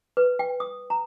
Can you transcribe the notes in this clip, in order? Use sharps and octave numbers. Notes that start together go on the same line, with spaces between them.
B4
G5
D#6
A#5